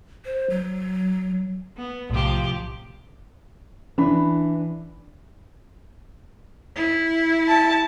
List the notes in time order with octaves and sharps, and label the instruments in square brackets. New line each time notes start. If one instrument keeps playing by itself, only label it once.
[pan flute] C5
F#3
[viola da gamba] B3
[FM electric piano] B1 A2 [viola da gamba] C3 F3 G4
[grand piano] E3 D4 B5
[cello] E4
[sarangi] A5